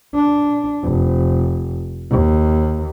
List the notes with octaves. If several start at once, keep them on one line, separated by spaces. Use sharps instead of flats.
D4
F1
D#2